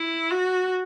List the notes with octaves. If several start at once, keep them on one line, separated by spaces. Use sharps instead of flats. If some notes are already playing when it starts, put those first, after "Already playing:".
Already playing: E4
F#4